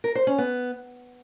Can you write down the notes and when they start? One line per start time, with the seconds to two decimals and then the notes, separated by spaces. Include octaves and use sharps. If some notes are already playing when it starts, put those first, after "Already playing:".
0.04 A#4
0.15 C5
0.27 C#4
0.38 B3